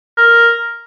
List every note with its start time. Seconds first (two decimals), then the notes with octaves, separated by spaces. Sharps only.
0.17 A#4